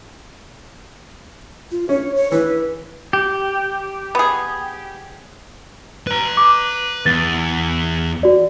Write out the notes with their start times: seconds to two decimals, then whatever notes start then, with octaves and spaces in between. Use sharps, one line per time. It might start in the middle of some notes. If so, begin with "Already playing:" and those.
1.71 F4
1.89 C#4 C#5
2.15 C#5
2.32 E3 B4
3.13 G4
4.15 B3 G#4
6.07 B4 A#5
6.37 D6
7.06 E2 A6
8.23 F#4 D5